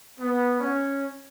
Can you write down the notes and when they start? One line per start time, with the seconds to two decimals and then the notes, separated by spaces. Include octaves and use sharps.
0.20 B3
0.60 C#4